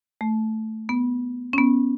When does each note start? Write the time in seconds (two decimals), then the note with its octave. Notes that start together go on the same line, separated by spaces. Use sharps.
0.21 A3
0.89 B3
1.53 C#4
1.58 B3